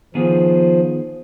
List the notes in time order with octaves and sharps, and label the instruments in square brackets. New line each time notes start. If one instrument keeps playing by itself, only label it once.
[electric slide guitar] D#3 B3 G#4 [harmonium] F3